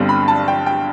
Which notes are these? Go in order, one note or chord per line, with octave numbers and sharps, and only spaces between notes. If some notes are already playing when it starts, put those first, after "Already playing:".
Already playing: G1 G2 D3 G3 C4
B5
A5
G5
G5